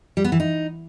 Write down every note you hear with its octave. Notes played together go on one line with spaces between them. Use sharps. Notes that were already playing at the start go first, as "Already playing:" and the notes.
G3
B3
E3
D#4